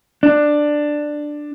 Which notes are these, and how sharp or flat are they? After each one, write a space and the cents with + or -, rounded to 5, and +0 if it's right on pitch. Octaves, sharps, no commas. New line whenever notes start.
D4 +10